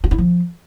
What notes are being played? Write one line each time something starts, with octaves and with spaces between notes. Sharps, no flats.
F4
E4
F3